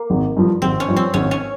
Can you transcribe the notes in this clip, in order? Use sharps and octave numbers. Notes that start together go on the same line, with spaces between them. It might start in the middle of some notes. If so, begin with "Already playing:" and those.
Already playing: A#3
G#1
G2 F3
G#1 C4
C#4
G2 F3
C4
G#1 C#4
C#4